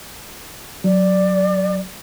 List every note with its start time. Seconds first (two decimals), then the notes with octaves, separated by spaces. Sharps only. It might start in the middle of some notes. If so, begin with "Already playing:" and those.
0.84 F#3 D5